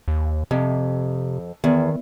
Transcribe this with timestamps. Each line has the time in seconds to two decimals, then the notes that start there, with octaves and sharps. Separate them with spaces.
0.08 D#2
0.51 F2 C3
1.64 E2 D#3